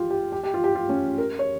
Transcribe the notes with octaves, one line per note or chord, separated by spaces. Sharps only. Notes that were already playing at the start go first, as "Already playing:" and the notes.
Already playing: F4 G4
G4
G4
G4
F4
G4
F4
C#4
A#4
C#5